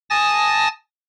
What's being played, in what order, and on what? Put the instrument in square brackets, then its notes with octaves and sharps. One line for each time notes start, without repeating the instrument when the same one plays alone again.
[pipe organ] G#5 A5 D#6 A6 A#6